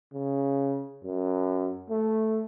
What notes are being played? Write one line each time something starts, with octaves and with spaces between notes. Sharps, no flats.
C#3
F#2
A3